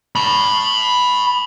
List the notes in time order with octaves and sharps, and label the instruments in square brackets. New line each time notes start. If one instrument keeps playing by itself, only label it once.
[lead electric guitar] A5 B5